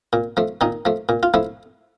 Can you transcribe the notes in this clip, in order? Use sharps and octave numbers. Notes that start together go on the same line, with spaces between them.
A#2
F3 A3
A#2 D#3 D#4
F3 A3
A#2
F4
F3 A3 E4